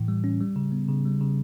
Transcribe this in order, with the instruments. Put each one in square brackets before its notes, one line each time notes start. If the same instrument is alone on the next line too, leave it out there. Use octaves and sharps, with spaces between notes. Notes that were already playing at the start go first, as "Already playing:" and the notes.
Already playing: [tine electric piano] A2 E3
G3
C#4
G3
C#3
B3
C#3
G3
C#3